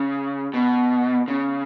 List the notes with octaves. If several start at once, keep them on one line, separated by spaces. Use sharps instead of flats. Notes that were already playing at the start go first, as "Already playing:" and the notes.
Already playing: C#3
B2
C#3